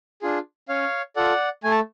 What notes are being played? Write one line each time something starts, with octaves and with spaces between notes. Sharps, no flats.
D4 F4 G#4
C#4 C#5 F5
F4 A4 D5 F#5
A3 G#5
A5